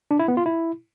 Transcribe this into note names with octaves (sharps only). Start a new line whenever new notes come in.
D4
E4
B3
F4
E4